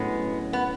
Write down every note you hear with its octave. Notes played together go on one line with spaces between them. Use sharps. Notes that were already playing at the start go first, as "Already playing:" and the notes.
Already playing: A2 F#3 G#3 A3 B3 C#4
B3